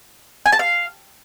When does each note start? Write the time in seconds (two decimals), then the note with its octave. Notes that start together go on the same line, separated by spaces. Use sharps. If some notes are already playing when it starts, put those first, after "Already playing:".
0.46 G#5
0.52 A5
0.59 F5